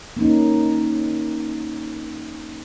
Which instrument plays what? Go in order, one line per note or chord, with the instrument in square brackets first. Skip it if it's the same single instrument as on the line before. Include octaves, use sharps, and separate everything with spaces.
[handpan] A#3 C#4 D#4